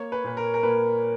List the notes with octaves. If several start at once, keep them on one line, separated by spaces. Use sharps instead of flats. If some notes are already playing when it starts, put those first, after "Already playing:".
Already playing: A#3 C#5
B4
A#2 B4
A#4
A#4
A#2 B4